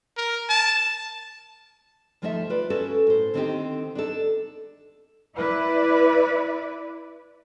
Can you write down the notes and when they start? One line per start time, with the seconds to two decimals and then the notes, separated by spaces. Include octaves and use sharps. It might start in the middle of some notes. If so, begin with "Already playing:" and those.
0.17 A#4
0.49 A5
2.22 D2 F3 A3 D#4 D#5 E5
2.50 F4 B4 D5
2.70 C#4 F#4 A4
3.07 A2 C5
3.34 D3 D#3 C4 D4 D#4 G4
3.95 D4 D#4 A4
5.36 E4 B4 D5